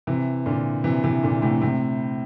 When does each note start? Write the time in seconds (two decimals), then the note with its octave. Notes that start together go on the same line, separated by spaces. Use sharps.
0.07 C3 E3
0.46 A#2 D3
0.84 C3 E3
1.04 C3 E3
1.23 A#2 D3
1.42 A2 C3
1.62 A2 C3